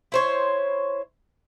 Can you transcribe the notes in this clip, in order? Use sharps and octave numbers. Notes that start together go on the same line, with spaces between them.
E4 C5 C#5